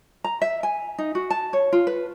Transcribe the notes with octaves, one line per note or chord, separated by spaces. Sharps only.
A#5
E5
G#5
D#4
F#4
A5
C#5
F4
B4